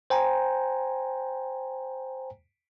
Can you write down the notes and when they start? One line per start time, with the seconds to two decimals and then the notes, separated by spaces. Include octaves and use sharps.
0.10 C5 G5 G#5 A#5